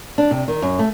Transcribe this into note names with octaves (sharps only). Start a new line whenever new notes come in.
D4
C3
D#3
F#2
A3